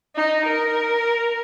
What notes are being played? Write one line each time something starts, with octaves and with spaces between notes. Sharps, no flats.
D#4
A#4